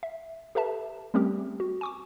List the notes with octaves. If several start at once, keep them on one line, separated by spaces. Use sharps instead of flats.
E5
G4 A4 B4 E5 A5
G3 A3 C4 C#4 G4 A#4
F#4
G#5 C#6 D6